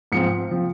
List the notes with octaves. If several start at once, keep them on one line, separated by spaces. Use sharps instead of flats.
G#2 F3 C4 C#7
F3 C4